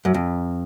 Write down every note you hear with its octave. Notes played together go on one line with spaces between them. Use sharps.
F#2
F2